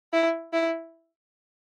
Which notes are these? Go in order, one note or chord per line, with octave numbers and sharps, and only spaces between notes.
E4
E4